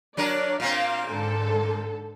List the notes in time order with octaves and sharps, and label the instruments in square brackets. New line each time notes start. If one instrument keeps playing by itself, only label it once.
[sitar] F#3 D4 A#4 [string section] C#5 D5
[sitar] A#2 A#3 C4 [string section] F5
[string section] G#2 D3 A4